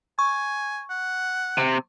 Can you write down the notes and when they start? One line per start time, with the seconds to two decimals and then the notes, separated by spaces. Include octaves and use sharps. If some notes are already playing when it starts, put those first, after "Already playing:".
0.19 G#5 C#6
0.90 F#5
1.58 C3